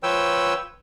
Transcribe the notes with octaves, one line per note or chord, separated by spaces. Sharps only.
F3 B4 C#5 G5 E6